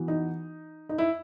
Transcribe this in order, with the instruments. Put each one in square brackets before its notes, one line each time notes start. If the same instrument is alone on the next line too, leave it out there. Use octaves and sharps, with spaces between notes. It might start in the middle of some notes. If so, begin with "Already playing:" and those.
Already playing: [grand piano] E3 B3 F#4
[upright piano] D#4
D#4
E4